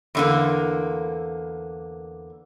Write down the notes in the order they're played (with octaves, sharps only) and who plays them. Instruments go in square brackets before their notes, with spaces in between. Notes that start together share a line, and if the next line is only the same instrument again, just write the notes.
[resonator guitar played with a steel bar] E2 D3 A#3